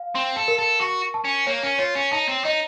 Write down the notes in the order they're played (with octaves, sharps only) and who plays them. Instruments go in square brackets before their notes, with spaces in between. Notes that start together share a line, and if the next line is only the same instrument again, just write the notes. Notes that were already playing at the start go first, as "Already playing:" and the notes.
Already playing: [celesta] F5
[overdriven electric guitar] C4 [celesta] C6
[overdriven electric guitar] A4
[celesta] A#4
[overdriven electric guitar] A4
[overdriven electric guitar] F#4 [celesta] C#6
[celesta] A5
[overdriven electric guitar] C#4
[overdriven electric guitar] A#3 [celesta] C#5
[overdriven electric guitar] C#4
[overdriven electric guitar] F4 [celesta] C#5
[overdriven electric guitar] C#4
[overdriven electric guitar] D#4 [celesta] A5
[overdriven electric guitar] C4
[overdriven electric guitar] D#4 [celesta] D#5